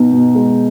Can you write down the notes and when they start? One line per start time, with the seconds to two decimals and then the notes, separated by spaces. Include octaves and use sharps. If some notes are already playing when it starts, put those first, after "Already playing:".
Already playing: B2 D#4
0.12 B2
0.35 G#3